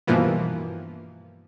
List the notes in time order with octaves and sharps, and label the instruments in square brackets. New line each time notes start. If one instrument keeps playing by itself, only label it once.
[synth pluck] G2 B2 E3 F3 A#3 B3